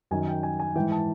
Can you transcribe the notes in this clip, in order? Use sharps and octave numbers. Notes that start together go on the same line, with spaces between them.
F#2 D#3 G#5
G5
G#5
G#5
G#2 E3 G5
A5